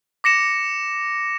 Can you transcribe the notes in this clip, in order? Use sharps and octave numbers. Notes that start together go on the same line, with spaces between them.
D6 A#6 C#7 E7